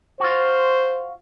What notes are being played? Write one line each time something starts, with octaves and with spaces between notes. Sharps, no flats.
F4 F#4 C5